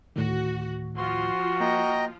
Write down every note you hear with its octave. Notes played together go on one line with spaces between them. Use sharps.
D2 A2 D#3 F#4
F3 F4 F#4 C6
A#3 D#5 G5 A#5